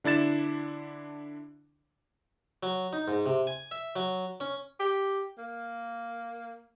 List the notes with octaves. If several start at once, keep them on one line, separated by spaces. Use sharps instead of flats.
D3 D4 E4 A6 E7
F#3
D#4
G#2
C3
G#5
E5
F#3
C#4
G4
A#3